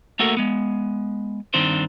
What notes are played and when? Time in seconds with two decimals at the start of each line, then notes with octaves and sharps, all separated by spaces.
0.19 A3 A#3 F#4 A4 A#4
0.37 G#3 B3
1.54 G2 D#3 C4 D4 C5